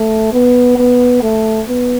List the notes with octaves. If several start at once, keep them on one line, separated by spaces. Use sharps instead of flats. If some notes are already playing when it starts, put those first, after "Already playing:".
Already playing: A3
B3
B3
A3
B3